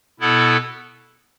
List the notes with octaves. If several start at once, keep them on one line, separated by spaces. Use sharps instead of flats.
B2 B3 E4 A4